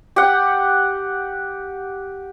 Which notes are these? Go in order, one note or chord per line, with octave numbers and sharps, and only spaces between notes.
G4 F#5